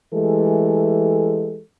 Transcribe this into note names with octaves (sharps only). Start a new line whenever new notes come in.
E3 G#3 A3 G4 A4